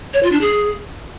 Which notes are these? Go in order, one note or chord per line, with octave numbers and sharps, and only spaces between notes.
C#5
F4
D4
G#4